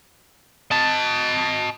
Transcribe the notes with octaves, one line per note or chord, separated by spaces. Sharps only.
D#5 A5